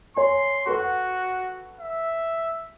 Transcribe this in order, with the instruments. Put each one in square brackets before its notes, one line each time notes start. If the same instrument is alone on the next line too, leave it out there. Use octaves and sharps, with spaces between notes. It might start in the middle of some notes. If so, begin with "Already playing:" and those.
[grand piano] C#5 G#5 [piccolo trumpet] C6
[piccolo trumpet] F#4 [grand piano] A4 B4 F#5
[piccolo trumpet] E5